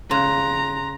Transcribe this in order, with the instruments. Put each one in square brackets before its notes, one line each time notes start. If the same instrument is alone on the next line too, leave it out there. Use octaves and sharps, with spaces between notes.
[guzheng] C#3 [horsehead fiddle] A#5 [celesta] C6 F#6